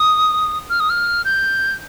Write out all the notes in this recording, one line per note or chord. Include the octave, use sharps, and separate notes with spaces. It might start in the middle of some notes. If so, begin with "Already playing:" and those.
Already playing: D#6
F6
D#6
F6
G6